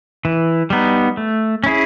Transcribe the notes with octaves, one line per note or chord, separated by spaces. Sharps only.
E3
G3 B3 D#4
A3
C#4 E4 G#4